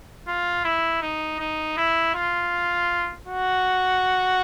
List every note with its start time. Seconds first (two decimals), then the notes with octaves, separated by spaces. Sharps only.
0.28 F4
0.64 E4
1.02 D#4
1.39 D#4
1.77 E4
2.15 F4
3.26 F#4